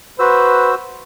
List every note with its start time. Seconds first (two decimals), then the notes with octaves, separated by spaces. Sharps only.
0.19 F#4 B4 C5 E6